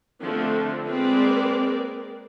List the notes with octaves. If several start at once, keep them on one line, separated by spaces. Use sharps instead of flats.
D3 F3 A3 C4
G#3 A#3 C4 A#4 B4 D5